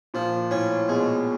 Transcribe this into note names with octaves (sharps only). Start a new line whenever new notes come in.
A#2 F3
A2 C#4
B2 G#3